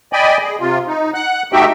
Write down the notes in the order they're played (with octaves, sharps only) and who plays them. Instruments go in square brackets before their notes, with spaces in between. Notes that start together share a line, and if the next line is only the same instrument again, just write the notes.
[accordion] D5 D#5 G5 G#5 B5
G#4
C3 F4
D#4
F#5 F#6
A3 D#4 F#4 G4 E5 G5